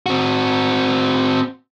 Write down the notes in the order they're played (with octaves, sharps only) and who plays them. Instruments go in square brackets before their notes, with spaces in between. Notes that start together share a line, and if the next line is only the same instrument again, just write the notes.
[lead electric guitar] C4 F#4